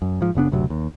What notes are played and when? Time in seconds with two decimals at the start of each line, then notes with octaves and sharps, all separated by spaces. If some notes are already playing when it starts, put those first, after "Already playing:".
0.02 F#2
0.21 G#2 F3
0.35 F#1 C#3 B3 D4
0.52 F#1 D2 C3 F#3
0.70 D#2